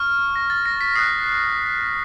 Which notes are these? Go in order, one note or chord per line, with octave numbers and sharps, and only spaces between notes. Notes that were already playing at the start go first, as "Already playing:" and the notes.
Already playing: C#6 F6
A#6
A6
A#6
B6
D#6 F#6 C7